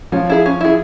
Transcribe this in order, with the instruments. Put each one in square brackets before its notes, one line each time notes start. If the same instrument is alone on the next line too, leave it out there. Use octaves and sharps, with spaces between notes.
[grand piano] F3 F4 [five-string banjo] C#4
[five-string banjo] E4 G#4
C#4
E4 G#4